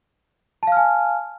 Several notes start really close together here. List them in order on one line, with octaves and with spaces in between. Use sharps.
A5 F5 F6 G#5